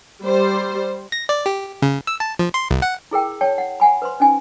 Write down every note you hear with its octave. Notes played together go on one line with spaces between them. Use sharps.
G3 C5
A#6
D5
G4
C#3
E6
A5
F3
C6
C2
F#5
E4 G#4 A#4 G5
C#5 G5 A5
F#5
F#5 G#5 B5
B4 C5 C6
C#4 D#4 G#5